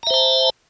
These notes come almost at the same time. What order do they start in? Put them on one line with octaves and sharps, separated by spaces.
A#5 E5 C5 A5